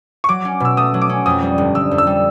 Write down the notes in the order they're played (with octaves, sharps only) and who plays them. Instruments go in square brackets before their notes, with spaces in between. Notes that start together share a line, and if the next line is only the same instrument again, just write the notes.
[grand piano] C#6
[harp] F#3 [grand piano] D6
[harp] C#4
[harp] B2 [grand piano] E6
[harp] A3 [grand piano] D#6
[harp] F#3
[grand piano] D6
[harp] C#4
[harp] F2 [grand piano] D#6
[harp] G3
G1
[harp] D3 [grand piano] E6
[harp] F2
[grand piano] E6
[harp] G3